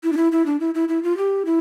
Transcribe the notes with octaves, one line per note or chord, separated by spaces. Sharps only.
E4
D4
E4
E4
D4
E4
E4
E4
F4
G4
E4